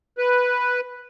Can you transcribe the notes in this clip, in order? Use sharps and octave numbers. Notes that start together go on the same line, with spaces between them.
B4